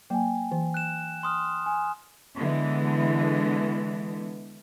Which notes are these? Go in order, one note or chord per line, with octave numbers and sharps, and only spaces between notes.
F#3 A#3 G5 G#5
E3
F#6 E7
C6 D#6 F6
G#5
D3 E3 G#3 B3